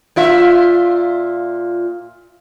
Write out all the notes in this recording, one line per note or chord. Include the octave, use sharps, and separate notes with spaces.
A#2 F4 E5